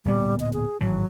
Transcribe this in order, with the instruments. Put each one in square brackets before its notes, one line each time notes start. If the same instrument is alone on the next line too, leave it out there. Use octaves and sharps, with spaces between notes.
[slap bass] D1 A#2 B3 [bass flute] G3
[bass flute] D#5
G#4
[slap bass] G#1 A2 E3 [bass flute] F#3